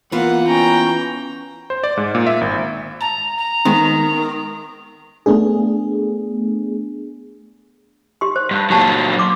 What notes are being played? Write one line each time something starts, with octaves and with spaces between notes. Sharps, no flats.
E3 A#3 B3 F4 F#5
C#4 G5 A#5
C5
D5
G#2
A#2
E5
G#1
A5 A#5
A#5
D#3 G#3 B3 C4
A3 B3 D4 G#4
G4 C6
C5
G2
A#2 F#3 G4 A5
C6 D6